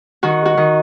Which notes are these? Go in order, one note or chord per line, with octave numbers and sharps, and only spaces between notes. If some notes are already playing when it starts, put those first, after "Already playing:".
D#3 F#4
F#4
D#3